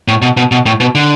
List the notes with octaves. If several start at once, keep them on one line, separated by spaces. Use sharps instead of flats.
A2
B2
B2
B2
A2
B2
D3